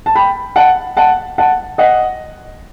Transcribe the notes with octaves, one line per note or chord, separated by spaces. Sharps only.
A5
G5 B5
F#5 A5
F#5 A5
F#5 A5
D#5 F#5